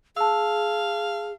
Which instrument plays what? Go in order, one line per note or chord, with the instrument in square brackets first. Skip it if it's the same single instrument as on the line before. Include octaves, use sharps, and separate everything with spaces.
[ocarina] G#4 [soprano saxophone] F5 [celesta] A5 E6